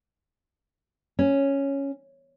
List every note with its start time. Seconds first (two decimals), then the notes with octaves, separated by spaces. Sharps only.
1.19 C#4